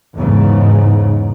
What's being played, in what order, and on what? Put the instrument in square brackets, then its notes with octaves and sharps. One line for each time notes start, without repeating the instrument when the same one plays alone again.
[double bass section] E2 G#2 C#3